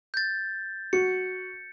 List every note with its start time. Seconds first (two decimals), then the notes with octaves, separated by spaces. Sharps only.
0.14 G6 A6
0.93 F#4 C#7